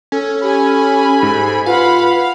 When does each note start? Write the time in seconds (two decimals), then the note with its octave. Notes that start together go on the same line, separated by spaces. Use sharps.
0.12 C#4 A4
0.42 G4 G#5 B5
1.22 G#2
1.66 F4 B4 F5 F#5 B5